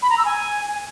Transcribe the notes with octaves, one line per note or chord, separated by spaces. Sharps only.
B5
A#5
E6
G#5